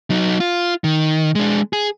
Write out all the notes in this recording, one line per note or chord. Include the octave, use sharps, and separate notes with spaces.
F#3 D#4
F4
D#3
G#3 D4
G#4